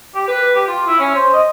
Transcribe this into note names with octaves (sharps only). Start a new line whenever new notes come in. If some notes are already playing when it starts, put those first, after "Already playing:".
G4
B4
G4
F4
E4
C#4
C5
D#5